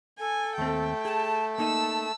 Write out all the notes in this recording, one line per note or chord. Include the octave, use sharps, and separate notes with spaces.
A4 G#5
D#2 A3 C4 G5
G#4 A5
A#3 D#4 D#5 A5 E6